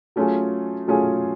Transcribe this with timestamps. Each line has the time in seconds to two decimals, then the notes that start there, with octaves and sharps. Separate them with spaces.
0.16 F#3 A3 C#4 F4 G#4
0.88 F#3 A3 C#4 F4 G#4